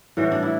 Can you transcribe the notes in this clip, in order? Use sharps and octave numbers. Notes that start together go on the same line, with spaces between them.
A2 E3 G3 F#4
D4
E4